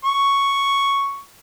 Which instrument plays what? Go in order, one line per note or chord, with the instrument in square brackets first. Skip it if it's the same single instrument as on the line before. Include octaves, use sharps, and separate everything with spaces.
[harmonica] C#6